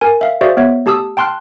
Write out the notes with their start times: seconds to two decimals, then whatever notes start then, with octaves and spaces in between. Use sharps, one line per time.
0.01 A#4 G#5
0.21 E5 F5
0.41 F#4 G#4 C5 D5 E5 F5
0.57 B3 C#5 E5
0.86 A3 G4 A5 D#6 E6
1.17 G5 A5 C6 F6 F#6